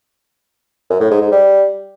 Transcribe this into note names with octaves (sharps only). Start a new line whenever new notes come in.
F#2
A2
G#2
G#2
G3